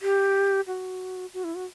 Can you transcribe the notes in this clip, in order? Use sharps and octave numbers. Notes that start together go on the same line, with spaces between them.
G4
F#4
F#4
E4
F#4